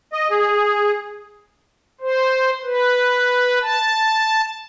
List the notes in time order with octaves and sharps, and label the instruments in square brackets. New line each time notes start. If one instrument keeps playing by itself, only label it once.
[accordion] D#5
G#4
[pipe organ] C5
B4
A5